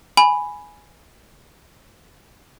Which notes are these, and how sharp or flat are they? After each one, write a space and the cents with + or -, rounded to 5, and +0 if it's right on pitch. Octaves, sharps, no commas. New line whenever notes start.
G#5 +0 B5 +0